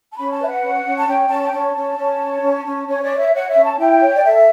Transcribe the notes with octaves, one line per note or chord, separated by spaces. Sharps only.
A5
C#4 B5
A5
B4 E5
F#5
C#4
C#4
A5
C#4 G5
C#4 A5
G5
C#4 A5
C#4
C#4
C#5
C#4
C#4
C#4 C#5
D5
C#5
E5
C#5 F#5
E5
C#4
A5
E4 G5
C#5
D5
A4 E5